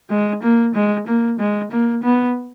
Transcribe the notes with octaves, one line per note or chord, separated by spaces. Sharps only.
G#3
A#3
G#3
A#3
G#3
A#3
B3